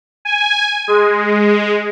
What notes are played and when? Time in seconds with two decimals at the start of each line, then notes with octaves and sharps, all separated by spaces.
0.25 G#5
0.88 G#3